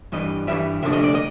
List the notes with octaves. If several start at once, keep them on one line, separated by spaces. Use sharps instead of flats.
G2 E3 G3 D#5
G2 E3 G3 E5
D2 C3 F3 A3 D4 E5
D#5
D5
D#5